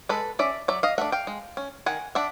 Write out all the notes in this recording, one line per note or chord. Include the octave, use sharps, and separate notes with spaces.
G#3 A4 B4
C#4 D5 E5
F#3 D5 E5
D#5 F5
A3 D4 E5 F#5
F5 G5
G#3
C#4
D#3 F#5 G#5
D4 E5 F#5